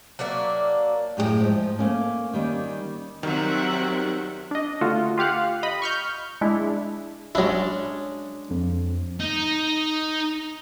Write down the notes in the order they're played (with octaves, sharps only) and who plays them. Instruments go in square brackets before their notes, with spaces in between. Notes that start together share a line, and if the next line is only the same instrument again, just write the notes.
[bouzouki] F#3 A#3 D4 E5
[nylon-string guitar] F#2 A2 G4 G#4 G5
G#2 F3
A3 A#3 C#4
D#3 G3 A#3 C#4
[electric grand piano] D#3 [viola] F#3 C4 [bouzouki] G3 [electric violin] E5 F#5
[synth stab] D4 D#5
D3 A3 F4 F#4
F4 G4 F5 F#5
D#5 B5
C#6 F6 G6
G#3 D4 E4
[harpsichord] F#3 E4 [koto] G#3 C#4 D4
[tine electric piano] F2
[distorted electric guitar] D#4